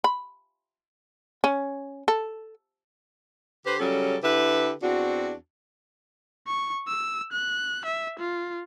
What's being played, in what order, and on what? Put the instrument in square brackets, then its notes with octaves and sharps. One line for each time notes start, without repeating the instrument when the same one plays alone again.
[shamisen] B5
C#4
A4
[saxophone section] D3 G4 B4 C5
C#3 F#3 G3 C#4 A4
D3 E4 G4 B4
E2 C4 D4 F#4
[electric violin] C#6
E6
F#6
E5
F4